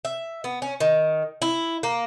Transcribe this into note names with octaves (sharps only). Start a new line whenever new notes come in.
E5
B3
C#4
D#3
E4
A#3